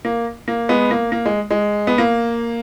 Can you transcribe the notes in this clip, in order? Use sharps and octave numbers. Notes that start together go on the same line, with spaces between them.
A#3
A#3
G#3 B3
A#3
A#3
G#3
G#3
B3
A#3